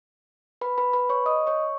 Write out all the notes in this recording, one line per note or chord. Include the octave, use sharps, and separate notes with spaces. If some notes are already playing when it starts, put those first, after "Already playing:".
B4 B5
B4 B5
B4 B5
C#5 C#6
D#5 D#6
C#5 C#6